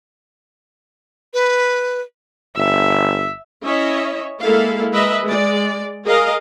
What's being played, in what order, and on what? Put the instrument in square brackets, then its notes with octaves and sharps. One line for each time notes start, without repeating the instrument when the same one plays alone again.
[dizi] B4
[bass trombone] G1 [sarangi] E5
[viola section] C#4 E4 C#5 D#5 E5
G#3 A#3 E4 A4 F5
G#3 A#4 B4 D#5 E5
G#3 D5
G#4 A#4 D#5 F5